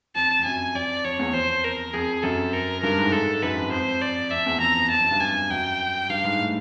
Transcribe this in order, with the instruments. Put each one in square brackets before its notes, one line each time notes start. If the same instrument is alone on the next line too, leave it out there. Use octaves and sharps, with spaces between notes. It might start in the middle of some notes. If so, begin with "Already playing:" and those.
[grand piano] F2 [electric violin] A5
[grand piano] F2
[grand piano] F#2 [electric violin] G#5
[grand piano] F2 [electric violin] D5
[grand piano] F2 [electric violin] C#5
[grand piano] E2
[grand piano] F2 [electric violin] C5
[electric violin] A#4
[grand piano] F2 [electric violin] G#4
[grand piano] F#2 [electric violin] A4
[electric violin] A#4
[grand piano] G2 [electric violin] A#4
[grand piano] G#2
[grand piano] G#2 [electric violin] A4
[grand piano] F#2 [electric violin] B4
[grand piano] F2
[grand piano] F2 [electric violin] C5
[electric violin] D5
[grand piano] F2 [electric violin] E5
[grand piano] E2
[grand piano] F2 [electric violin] A#5
[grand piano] F2
[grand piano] F2 [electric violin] A5
[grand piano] F#2
G2
[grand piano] F2 [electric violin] G#5
[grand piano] F#2 [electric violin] G5
[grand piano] G2 [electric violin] F5
[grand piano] G#2
A2